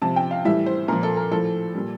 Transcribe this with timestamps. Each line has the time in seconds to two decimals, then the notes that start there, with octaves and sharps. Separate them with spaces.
0.02 C3 F3 A5
0.16 G5
0.31 F5
0.45 A2 E3 G3 E5
0.66 C5
0.88 A#2 F3 A#4
1.03 A4
1.17 A#4
1.31 A2 F3 A4
1.75 A#2 G3